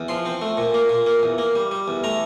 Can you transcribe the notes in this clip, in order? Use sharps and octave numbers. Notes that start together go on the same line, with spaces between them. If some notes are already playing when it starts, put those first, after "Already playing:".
Already playing: E2
F3 C6
C4
A3
A#2
A#3
A#2
A#3
E2
A#3
G3
G3
E2
A3 A#5